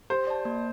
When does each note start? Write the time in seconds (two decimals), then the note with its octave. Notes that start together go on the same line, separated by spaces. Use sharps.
0.10 G4 C5
0.27 D5 A5
0.45 A#3